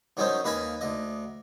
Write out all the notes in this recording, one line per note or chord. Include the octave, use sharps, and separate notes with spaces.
D#3 F#3 C#4 D#4 C5
D#2 B4 D#5 F5 G#5 B5
D2 D#5